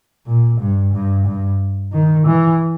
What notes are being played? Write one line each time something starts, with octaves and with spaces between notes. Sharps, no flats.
A#2
G2
G2
G2
D#3
E3